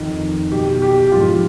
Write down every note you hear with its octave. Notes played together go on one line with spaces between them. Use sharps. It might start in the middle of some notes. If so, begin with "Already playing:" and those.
Already playing: F2 D#3
B2 G4
G4
G4
G#2 F3 F4